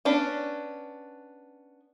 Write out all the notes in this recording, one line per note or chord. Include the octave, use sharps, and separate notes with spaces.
B3 C#4 D4